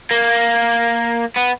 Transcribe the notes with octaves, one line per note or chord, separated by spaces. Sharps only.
A#3
B3